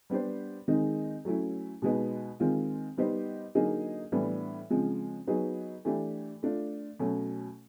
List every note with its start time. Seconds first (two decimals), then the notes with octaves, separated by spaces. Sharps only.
0.10 G3 B3 D4 G4 C5
0.68 D#3 G#3 C4 D#4 G#4
1.25 F#3 A3 C#4 E4
1.82 B2 G#3 B3 D#4
2.40 D#3 G#3 C4 F4
2.98 G3 B3 D#4 G4 C5
3.55 D3 F#3 A#3 D#4 G#4
4.12 A2 E3 G3 B3 D4
4.70 C#3 F3 G#3 C4
5.27 F#3 B3 D#4 G#4
5.85 E3 A3 D4 G4
6.43 A3 D4 F4
6.99 B2 F#3 A3 C#4